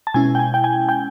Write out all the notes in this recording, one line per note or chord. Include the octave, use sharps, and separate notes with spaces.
A5
B2 G#3 C#4 E4 G#5
G5
G#5
G5
G#5
G5